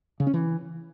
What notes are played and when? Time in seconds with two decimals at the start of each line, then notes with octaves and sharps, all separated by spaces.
0.20 C#3
0.27 C#4
0.34 E3